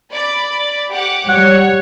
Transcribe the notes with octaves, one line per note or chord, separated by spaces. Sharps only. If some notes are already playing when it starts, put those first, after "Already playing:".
D5 B5 A6
G4 F#5 D6
G3 C#5 F#5